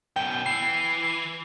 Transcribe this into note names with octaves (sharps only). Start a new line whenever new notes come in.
F#2 B2 G5
E3 C7